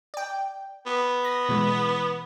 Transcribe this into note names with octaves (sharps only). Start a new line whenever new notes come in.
D5 G5
B3
A#6
B2 E3 G#3